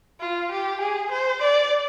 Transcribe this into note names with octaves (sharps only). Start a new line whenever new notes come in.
F4
G4
G#4
C5
D5